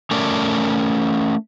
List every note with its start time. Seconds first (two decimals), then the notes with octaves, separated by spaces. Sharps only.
0.11 A3 C#4 A#4 D5